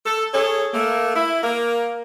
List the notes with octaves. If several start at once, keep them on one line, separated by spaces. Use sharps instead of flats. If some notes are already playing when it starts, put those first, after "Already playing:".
A4
G#4 A4 C#5
A3 A#3
E4
A#3 A#4